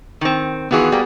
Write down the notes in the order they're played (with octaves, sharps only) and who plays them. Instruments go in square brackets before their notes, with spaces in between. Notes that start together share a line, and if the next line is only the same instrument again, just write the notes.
[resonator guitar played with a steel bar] D#3 C4
[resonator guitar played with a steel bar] D#3 E3 F4 [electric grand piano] B3 F#4 G#4
[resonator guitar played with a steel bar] G3 A#3